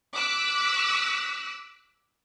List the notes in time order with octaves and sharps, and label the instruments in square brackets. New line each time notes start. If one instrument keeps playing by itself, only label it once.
[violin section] D6 E6 F#6 B6